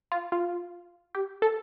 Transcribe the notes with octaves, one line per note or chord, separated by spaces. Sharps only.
F4
F4
G4
A4